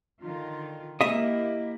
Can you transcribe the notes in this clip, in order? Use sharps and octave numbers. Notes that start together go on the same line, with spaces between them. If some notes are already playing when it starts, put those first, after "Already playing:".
D3 D#3 F4
A#3 E4 G4 D#5 E5